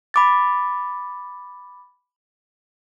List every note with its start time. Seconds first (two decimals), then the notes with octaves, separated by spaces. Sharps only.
0.14 B5 D6 A6